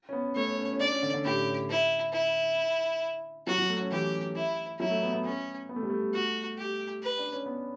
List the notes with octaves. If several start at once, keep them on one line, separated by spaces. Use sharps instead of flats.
C#4
B3
A3 C#5
C#4
C#4
D4 D5
C#4
D3
D3
A2 G4
E4
E4
F#3 F#4
F#3
A3
C#4
E3 G4
E4
F#3 E4
A3
B3
B3
C#4
B3
A3
G3
A3
F#4
G4
B4
D4
C#4
B3